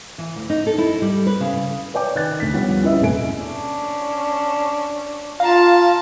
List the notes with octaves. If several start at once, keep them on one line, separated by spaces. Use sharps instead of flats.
E3
D2
D#4
A4
E4
G3
B4
C#3
B4 C#5 D5 G5 D6
D#3 F#6 A6
D2 B6
F3 G3 B3 D4 C#5
C#4 E4 B4 D#5 E5
D#1 C2 F#2 A3 G#5 D7
C#4 D4
F4 F5 A5 A#5